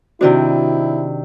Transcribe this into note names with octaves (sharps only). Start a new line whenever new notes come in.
C3 D#3 D4 E4 F#4 C5 D5